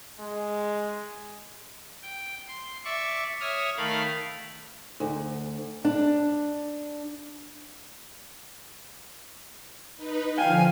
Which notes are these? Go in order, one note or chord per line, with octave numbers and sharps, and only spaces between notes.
G#3
G5
C6
D5 E5 C#6
C#5 E5 D#6 F6
D#3 A3 A#4 F5 B5
D2
D4
D#4 B4
D3 F3 F5 G5 G#5